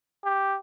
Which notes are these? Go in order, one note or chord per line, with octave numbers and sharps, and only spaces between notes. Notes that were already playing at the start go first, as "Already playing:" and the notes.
G4